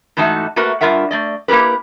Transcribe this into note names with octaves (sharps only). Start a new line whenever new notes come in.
G#2 E3 A3 D#4 F#4 A5
A3 A#3 F#4 A#4 B4
G2 A#2 F4 A#4 E5 F#5
A3 D5 D#5
A#3 E4 G4 A#4 B4